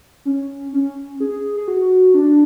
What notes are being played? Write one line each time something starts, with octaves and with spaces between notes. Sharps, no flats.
C#4
C#4
G#4
G#4
F#4
D4